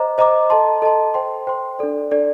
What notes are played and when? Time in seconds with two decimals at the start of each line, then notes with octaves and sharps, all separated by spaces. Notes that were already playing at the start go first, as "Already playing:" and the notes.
Already playing: C5 D#5 A#5 D6
0.18 C5 D#5 A#5 D6
0.50 A4 D#5 A5 C6
0.82 A4 D#5 A5 C6
1.14 C5 G5 C6
1.47 C5 G5 C6
1.79 D4 A4 D5
2.11 D4 A4 D5